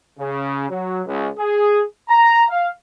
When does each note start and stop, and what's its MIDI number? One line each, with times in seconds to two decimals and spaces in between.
0.19 0.67 49
0.70 1.01 54
1.06 1.28 37
1.38 1.82 68
2.09 2.43 82
2.49 2.68 77